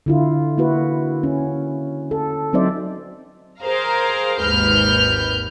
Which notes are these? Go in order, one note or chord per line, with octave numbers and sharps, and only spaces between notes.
D3 E4 F4
A#3 E4 F#4 B4
C#4
A4
F#3 C4 D#4 C5 D5 E5
G#4 A#4 C5 F5 A#5
G#1 D#2 G#2 B4 F6 G6